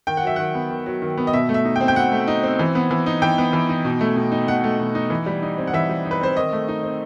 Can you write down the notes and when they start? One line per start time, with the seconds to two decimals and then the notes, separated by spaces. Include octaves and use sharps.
0.07 D#3 G5
0.17 F#5
0.23 F#3 E5
0.36 D#3 F#5
0.55 B3
0.71 D#3
0.86 F#3
1.02 D#3
1.18 B3
1.27 D#5
1.33 B2 E5
1.49 A3
1.54 E5
1.65 D#4
1.76 G5
1.81 C4
1.88 G5
1.96 B2 F#5
2.12 A3
2.28 D#4
2.43 C4
2.59 E3
2.75 B3
2.91 E3
3.06 D#4
3.22 E3 G5
3.38 B3
3.53 E3
3.69 D#4
3.85 B2
4.01 A3
4.16 B2
4.32 D#4
4.48 B2 F#5
4.64 A3
4.79 B2
4.95 D#4
5.10 E3
5.26 G3
5.43 D#4
5.58 C4
5.67 F#5
5.74 E3 E5
5.89 G3
6.05 D#4
6.11 B4
6.21 C4 C5
6.37 D#3 D#5
6.53 A3
6.68 D#4
6.83 C4